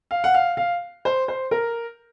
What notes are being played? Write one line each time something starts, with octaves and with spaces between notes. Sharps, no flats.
F5
F#5
F5
F5
C5
C5
A#4